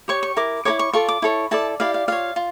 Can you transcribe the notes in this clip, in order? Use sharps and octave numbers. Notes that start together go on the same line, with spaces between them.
G4 C#5 C#6
C#6
E4 A#4 D6
E4 A#4 C#5 D6
C#6
F4 A4 D5 C#6
D6
E4 A4 C#5 C#6
E4 A4 D5 A5
E4 G4 D5 F5
F5
F4 C#5 F5
F4